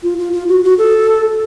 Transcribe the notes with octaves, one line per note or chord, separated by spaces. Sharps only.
F4
F4
F4
F#4
F#4
A4